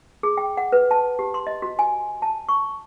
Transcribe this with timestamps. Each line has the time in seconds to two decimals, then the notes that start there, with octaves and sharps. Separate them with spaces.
0.23 G#4
0.37 G5
0.57 F#5
0.72 B4
0.91 A5
1.19 G4
1.34 C6
1.47 D#5
1.62 F#4
1.79 G#5
2.22 A5
2.49 C#6